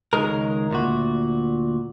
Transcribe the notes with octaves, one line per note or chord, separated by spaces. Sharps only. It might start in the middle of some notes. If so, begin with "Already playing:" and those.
C#2 D#3 G#3 A#4
D2 A#2 F#4